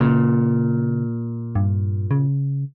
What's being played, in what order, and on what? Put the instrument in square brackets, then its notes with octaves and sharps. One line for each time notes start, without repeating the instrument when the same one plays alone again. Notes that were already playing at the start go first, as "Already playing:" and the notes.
[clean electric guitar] A#2 [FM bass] C#3
[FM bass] G2
C#3